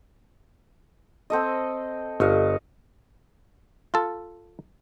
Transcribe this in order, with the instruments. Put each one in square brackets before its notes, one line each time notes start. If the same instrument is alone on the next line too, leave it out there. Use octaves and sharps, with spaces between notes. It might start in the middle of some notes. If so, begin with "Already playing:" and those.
[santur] C4 A4 D#5
[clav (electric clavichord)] G1 [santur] C#5 D#5 F5
[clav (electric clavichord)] F4 A4